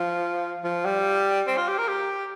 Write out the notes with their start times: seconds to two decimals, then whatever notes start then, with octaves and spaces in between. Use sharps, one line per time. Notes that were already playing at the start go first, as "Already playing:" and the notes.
Already playing: F3
0.64 F3
0.85 G3
1.47 C4
1.57 F4
1.68 G4
1.78 A#4
1.88 G4